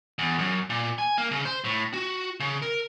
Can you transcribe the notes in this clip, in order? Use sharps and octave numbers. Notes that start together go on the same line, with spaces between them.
E2
F#2
A#2
G#5
A#3
C#3
C5
A2
F#4
C#3
A#4